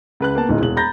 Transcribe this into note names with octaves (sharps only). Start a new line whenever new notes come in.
C#2 B4 F#6
A#3 B3 A5
D1 D2 D#4
E1 F#7
A#5 B5 G6 A6 A#6